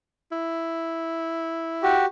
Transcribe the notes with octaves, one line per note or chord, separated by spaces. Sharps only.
E4
F#4 G4